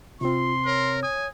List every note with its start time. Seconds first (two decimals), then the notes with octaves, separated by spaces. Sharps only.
0.21 C3 C4 F4 C6
0.66 A#4 C#5
1.03 G#5 D#6